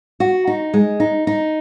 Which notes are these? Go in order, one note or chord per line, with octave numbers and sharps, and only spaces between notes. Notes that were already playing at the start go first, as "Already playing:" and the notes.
F#4
D#4
G#3
D#4
D#4